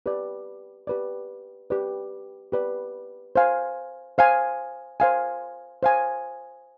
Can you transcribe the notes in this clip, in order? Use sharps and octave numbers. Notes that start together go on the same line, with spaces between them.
G4 B4 D5
G4 B4 D5
G4 B4 D5
G4 B4 D5
C5 F5 G#5
C5 F5 G#5
C5 F5 G#5
C5 F5 G#5